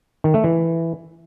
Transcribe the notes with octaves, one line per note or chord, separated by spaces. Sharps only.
D#3
A3
E3